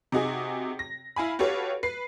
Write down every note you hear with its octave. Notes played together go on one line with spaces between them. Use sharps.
C3 D#4 F#4 G#4
A#6
E4 F5 G#5 B5
F#4 G4 A4 B4 C#5 F5
B4 C7